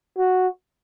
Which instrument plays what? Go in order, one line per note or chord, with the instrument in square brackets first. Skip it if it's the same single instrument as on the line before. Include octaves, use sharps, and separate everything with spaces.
[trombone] F#4